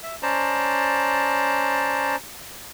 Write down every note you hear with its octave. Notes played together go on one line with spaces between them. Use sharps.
E5
C#4 C5 D5 A5 A#5